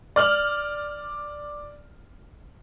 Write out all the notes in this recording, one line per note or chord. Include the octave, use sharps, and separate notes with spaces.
D5 F6 F#7